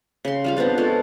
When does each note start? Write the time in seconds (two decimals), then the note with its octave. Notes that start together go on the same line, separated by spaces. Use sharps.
0.25 C#3 C6
0.44 G3 F4 F5
0.57 B3 C4 D4 F4
0.78 G#3 F4 A4 C#5